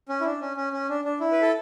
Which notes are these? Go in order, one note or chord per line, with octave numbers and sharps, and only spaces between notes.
C#4
E4
D4
C#4
C#4
C#4
D4
D4
E4
B4
A4